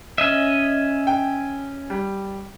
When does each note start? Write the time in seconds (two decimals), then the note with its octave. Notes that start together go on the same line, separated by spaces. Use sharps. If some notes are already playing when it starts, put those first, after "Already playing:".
0.18 C#4 D#5 E5
1.07 G5
1.90 G3